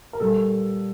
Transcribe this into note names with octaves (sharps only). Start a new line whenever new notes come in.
A#4
A#2 G3 A4